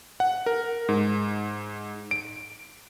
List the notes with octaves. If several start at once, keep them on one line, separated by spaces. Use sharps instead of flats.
F#5
A#4
G#2
D7